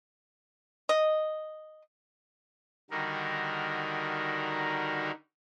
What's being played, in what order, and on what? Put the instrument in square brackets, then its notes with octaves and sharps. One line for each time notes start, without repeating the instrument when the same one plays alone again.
[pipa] D#5
[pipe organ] D3 D#3 G3 D#4 F#4 A#4